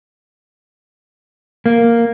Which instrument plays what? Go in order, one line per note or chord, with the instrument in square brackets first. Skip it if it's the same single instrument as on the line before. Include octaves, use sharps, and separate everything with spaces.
[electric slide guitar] A#3